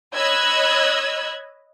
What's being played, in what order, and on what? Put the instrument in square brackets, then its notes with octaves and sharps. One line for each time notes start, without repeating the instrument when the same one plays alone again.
[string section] C#5 D#5 B5 E6 F#6 G#6